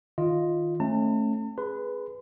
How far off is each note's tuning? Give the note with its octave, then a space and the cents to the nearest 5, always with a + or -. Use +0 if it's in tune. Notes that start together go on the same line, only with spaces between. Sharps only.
D#3 +5 F4 +0 D#5 +0
A3 +0 C#4 -30 A5 +40
G#4 +0 B4 +0 C6 -35